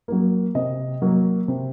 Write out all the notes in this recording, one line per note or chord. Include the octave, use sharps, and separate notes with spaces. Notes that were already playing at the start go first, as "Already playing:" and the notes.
F#3 A#3
C3 D#5
F#3 A#3
C3